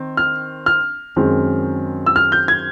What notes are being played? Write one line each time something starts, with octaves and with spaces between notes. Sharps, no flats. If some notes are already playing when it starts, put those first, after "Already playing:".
Already playing: D#3 C4
F6
F6
F#2 D#3 G#3 C4
E6
F6
G6
G#6